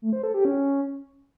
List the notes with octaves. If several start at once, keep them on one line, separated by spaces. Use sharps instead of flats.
A3
C5
A4
G4
C#4